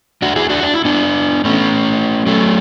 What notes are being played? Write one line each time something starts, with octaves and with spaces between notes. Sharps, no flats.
D4 F#4
E4 G#4
D4 F#4
D4
E4
B3 D4
A3 C#4
F#3 A3